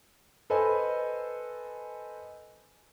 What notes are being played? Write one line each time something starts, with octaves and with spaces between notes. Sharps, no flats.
A4 B4 C5 D#5 G#5